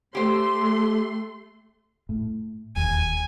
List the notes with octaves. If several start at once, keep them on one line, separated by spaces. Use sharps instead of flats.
A3 G4 C5 C6
A2
E1 D#2 D#3 G#5